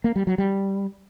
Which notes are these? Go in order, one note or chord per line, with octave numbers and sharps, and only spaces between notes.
A#3
G3
F#3
G3